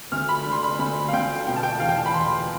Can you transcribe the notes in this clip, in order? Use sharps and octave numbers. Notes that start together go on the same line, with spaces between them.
D2 F6
B5
D3
C6
B5
D2 B5
F5
D2 G5
B2 G5
A5
G5
E2 F5
G5
A5
B5
E2 C6